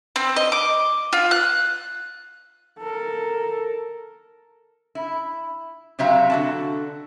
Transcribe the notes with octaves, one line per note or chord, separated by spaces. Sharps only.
C4
D#5
D6
F4
F#6
A4 A#4
E4
C3 F#3 C4 E5 F5 A#5
D3 F#4 A5